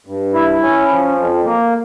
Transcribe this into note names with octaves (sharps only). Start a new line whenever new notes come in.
G2
E4
C#4
F3
F2
A#3